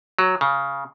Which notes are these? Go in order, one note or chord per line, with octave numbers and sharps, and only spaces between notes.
F#3
C#3